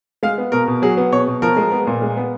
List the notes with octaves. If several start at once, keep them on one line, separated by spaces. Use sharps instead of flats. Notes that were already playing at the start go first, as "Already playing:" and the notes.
G#3 F5
B3
B2 A#4
B2
F#3 G#4
B3
B2 C#5
B2
F3 A#4
G#3
B3
A#2
G#3
B3